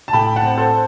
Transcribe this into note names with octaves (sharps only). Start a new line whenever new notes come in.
A5
A2 G5 B5
F#5 A5
C4
A4 C5